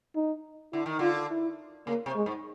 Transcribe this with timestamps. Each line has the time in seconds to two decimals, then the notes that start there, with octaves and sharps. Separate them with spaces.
0.15 D#4
0.73 D3 E4
0.86 D#3
0.99 D3 F4
1.31 E4
1.87 C#3 A#3
2.06 C3
2.16 G#3
2.26 G#2